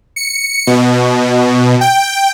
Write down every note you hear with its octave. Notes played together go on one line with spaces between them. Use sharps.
C#7
B2
G5